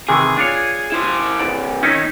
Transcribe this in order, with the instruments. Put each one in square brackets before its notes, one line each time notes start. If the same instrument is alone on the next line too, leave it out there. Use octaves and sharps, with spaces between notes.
[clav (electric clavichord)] C3 D#3 E3 [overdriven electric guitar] G#4
[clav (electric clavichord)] D4 F4 C#5
[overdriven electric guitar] E4 C5
[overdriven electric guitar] C2 G2 [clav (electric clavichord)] D5
[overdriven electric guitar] D#3 [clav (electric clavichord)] C#4 D#4 E4